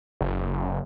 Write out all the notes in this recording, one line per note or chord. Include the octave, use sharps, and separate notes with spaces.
F#1